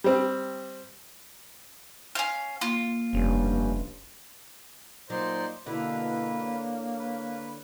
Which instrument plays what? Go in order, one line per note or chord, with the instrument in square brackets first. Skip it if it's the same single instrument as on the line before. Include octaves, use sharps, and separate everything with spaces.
[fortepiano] G3 C4
[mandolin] C#4 F5
[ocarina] A#3 [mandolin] F4
[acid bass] F1 [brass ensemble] G2 C#4
[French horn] A#2 [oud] F#3 [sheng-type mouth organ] D#4 D5 C6 [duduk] C5
[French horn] B2 [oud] D3 E4 [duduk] A#3 [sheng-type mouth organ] B4
[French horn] C#5
[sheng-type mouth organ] B4